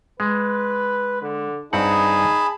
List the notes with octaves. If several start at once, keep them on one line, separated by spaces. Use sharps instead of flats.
G#3 B4
D3
G2 C4 D#4 G#4 F#5 A5 B5